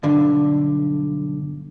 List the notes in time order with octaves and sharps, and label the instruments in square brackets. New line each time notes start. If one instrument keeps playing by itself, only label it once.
[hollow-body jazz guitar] B1 G2 D3